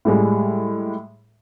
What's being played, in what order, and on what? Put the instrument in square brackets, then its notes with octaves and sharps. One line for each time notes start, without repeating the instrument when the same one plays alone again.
[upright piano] A2 G3 G#3